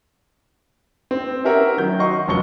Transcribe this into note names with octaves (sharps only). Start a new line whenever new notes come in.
C4
C#4 E4 G4 A#4 E5 F#5
D#3 F#3 G6
D#5 F#5 C6 C#6
F1 F3 F#3 C#6 C#7 G7